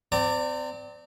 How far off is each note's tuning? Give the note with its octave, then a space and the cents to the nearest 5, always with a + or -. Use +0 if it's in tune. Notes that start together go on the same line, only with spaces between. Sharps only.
C4 -30 D5 +0 A#5 -45